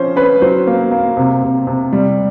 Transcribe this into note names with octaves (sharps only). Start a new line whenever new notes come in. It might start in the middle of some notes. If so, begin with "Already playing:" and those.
Already playing: F3 C#4 C5
C#4 B4
F#3 C5
A#3
A#3
C3
C3
C3
G3